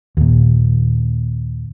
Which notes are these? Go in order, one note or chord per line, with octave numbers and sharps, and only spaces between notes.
D#2 A#2